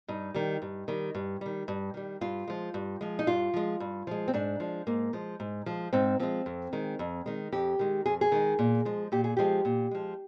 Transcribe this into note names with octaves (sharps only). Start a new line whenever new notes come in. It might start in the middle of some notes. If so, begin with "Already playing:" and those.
G2 D#4
D#3 G3
G2
D#3 G3
G2
D#3 G3
G2
D#3 G3
G2 F4
F3 G#3
G2
F3 G#3
D#4
G2 F4
F3 G#3
G2
F3 G#3
C4
G#2 D4
F3 G#3
G#2 A#3
F3 G#3
G#2
F3 G#3
G#2 C4
F3 G#3 C4
F2
D#3 G#3
F2
D#3 G#3
F2 G4
D#3 G#3
F2 G#4
G#4
D#3 G#3
A#2
F3 G#3
A#2 G4
G#4
F3 G#3 G4
A#2
F3 G#3